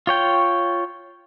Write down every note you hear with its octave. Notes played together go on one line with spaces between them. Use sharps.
F4 C#5 G5